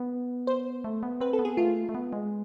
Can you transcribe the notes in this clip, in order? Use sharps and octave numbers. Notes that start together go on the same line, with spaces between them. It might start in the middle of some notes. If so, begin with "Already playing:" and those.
Already playing: B3
C5
A3
B3
C4 B4
A4
B3
G#4
A3 F4
A3
B3
G#3